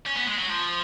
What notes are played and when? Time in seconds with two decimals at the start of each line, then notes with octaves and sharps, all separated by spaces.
0.06 C#4
0.17 B3
0.27 G#3
0.38 F#3
0.49 F3